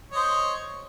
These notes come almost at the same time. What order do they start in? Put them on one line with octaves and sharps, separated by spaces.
C#5 D#5 C5